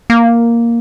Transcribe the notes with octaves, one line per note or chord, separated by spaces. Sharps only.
A#3